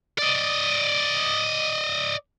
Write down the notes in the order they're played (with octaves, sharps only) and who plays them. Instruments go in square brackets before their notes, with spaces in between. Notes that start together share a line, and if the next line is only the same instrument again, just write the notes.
[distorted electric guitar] D5 D#5